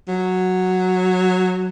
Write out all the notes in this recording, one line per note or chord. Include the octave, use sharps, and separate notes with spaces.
F#3